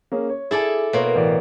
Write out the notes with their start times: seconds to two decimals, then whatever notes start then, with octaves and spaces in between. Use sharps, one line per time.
0.12 A#3 C#4 G#4
0.29 C#5
0.51 E4 G#4 A4 D5 G#5
0.93 B2 A#3 B4 C#5 C6
1.16 A1 D5